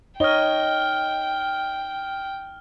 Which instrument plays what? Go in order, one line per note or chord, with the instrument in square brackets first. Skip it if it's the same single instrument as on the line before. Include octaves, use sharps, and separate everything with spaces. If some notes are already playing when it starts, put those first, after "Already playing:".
[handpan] D#4 C#5 D#5 [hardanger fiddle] G5 [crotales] F6 G7